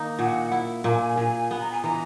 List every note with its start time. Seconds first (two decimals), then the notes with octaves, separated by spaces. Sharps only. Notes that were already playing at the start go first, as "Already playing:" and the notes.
Already playing: D#3 A#3 D#4
0.19 A#2 F#5
0.52 E4
0.84 A#2 A#5
0.89 G#5
1.17 A#2 G#5
1.51 B3
1.61 A#5
1.71 G#5
1.83 E3 A#5